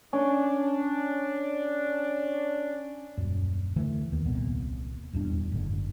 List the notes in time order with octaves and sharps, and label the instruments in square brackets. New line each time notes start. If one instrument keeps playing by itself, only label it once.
[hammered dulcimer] C#4 [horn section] D4
[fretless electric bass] D#1 F#2
D3 E3 A3
D#2 D#3
D#1 C2 A#2 B3
D#1 E2 G2 D4
F#1 G#2 B2 D3